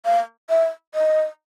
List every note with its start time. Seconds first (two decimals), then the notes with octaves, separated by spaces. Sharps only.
0.05 F5
0.50 E5
0.95 D#5